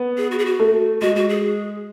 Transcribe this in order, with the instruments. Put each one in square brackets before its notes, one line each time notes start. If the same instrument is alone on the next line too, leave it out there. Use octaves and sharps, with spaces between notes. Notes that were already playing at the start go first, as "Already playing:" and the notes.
Already playing: [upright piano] B3
[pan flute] G#4
F#4
G#4
F#4
[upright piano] A3
[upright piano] G#3 [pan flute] F#4
[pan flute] F#4
G#4